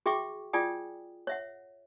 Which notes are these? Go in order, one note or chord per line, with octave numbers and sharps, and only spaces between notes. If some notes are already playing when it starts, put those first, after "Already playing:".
F#4 G#4 E5 G5 C#6 D6
F4 G#4 D5 G5 G#5 D#6
C#5 E5 F#5